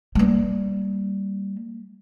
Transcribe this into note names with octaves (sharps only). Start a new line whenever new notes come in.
G3 A#3